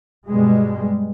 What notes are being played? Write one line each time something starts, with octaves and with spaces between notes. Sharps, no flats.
G2 B2 G3 G#3